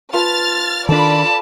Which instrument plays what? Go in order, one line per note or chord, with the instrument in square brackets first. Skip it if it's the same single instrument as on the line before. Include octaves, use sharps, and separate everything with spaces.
[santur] F4 B4 A5 [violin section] F6 A6
[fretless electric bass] D#3 D4 [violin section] F4 D5 B5 [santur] A4 [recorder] A5